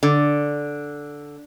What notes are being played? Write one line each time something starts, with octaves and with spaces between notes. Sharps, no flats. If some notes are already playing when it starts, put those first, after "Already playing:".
D3